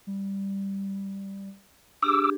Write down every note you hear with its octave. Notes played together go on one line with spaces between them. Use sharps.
G3
D4 G4 G#4 D6 E6